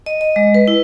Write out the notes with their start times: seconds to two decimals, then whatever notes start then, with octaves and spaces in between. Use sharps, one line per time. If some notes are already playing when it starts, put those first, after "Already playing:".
0.06 D#5
0.21 D#5
0.36 G#3
0.54 B4
0.68 E4